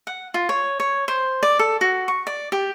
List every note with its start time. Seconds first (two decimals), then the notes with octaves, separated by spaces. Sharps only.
0.07 F#5
0.34 F4
0.49 C#5
0.80 C#5
1.08 C5
1.43 D5
1.59 A4
1.81 F#4
2.08 C#6
2.27 D5
2.52 G4